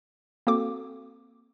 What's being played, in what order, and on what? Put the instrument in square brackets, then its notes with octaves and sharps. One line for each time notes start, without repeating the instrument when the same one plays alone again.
[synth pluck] A#3 C4 F#4 A4 D6